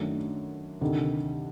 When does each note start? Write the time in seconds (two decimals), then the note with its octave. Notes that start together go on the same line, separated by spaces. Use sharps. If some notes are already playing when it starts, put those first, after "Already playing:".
Already playing: F#2 D#3 F#3 A3 D4
0.81 D2 C3 D#3